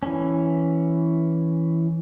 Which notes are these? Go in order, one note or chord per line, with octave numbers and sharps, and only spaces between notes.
E3 C#4